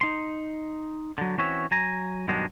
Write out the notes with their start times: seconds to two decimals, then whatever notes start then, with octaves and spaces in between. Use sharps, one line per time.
0.01 D#4 C6
1.18 D3 F#3
1.38 E3 C4 C#4 F#4 C#5 E5
1.71 F#3 G#5 A#5
2.28 G2 B2 D#3 F#3 G#3 D4